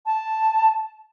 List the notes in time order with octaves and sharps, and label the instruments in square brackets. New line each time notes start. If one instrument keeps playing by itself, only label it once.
[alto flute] A5